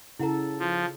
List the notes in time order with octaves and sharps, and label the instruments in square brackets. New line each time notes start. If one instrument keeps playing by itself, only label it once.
[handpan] C#3 A4 [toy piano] E4 F#5 A#5
[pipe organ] F3